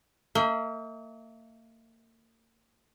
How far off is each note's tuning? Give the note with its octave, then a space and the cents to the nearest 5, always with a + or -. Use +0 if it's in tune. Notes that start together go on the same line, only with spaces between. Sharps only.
A#3 -40 E5 -45